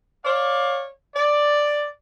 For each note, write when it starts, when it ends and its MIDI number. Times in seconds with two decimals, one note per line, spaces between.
0.25 0.85 73
0.25 0.85 74
0.25 0.85 77
1.14 1.87 74